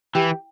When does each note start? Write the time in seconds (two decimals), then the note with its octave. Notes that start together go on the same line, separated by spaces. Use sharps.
0.15 E3 G4